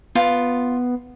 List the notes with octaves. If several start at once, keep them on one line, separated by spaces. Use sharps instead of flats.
B3 F4